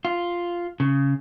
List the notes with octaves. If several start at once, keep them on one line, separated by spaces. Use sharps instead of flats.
F4
C#3